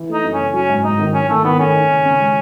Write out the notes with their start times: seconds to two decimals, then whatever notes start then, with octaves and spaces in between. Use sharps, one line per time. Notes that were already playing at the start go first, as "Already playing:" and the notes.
Already playing: E3
0.09 A3 D#4
0.23 F#2
0.34 C#3 C#4
0.53 F#3 C#4
0.69 G#2
0.84 G#2 D#4
0.99 D#3
1.14 C#4 D#4
1.29 D#3 A3
1.44 D#3 B3
1.60 A3 C#4
1.75 D#4
1.90 C#3
2.06 C#3
2.20 G#3